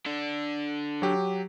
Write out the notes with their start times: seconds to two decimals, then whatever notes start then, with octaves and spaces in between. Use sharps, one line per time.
0.06 D3 D4
1.02 F#3 G4